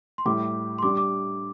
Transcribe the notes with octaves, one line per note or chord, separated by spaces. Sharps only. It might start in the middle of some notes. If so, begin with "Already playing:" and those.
C6
A2 G3 E4 G4 D6
C6
G3 D4 G4 D6
D6